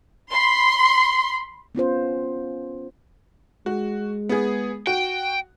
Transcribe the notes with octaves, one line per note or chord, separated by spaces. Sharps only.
B5 C6
B3 C#4 F4 C5
G#3 F#4
B3 G#4
F#4 G5